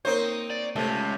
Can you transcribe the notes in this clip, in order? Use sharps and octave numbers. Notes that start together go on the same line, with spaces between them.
A#3 C4 D#4 C5 C#5
D5
C#2 C3 A3